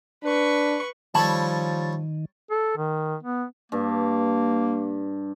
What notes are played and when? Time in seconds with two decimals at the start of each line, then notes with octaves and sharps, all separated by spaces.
0.24 D4 B4 C#6
1.15 D#3 F3 G3 A4 C#5 A5 B5
2.51 A4
2.77 D#3
3.23 B3
3.72 G2 A#3